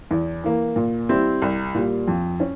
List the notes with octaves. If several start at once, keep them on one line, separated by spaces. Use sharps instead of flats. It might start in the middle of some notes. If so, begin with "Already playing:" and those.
E2
E3 A#3
A#2
G3 C4 E4
C2
A#2 G3
F2
C#4